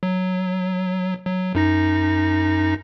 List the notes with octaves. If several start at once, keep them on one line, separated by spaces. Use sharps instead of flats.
F#3
F#3
F#2 D#4 A#6